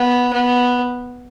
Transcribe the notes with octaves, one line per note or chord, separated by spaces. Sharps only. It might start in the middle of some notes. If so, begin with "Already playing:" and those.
Already playing: B3
B3